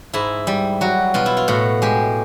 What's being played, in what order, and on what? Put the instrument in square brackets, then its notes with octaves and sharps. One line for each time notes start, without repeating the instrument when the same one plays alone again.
[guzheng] G#2 E4
G3
F#3 F#4
B2 F4
E4
F4
A2 F#4
G#3 G4